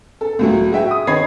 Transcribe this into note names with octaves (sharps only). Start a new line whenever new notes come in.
A4
C#2 A2 F#3
F#4 G#4 E5 G5
D#6
D#3 C#5 D#5 B5 G#6 C7